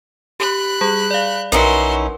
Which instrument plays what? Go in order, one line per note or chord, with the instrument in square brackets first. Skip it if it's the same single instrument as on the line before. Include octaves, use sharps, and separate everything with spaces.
[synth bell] G4 [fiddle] B5 F#6
[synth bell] G3 G#4
D5 F5
[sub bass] B1 [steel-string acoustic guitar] C#4 D#4 E4 [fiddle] F#4 C6 [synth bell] A#4 B4